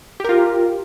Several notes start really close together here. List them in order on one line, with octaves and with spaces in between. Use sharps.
G4 A#4 F4